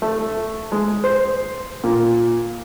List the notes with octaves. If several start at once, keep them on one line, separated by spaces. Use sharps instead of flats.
A3
G#3
C5
A#2